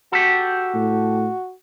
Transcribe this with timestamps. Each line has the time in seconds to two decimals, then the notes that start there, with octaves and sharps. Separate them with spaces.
0.12 F#4 G4 A4
0.75 A2